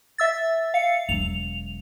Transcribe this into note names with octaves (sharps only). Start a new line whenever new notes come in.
E5 E6 A6
F5 C#7
E1 F#3 F7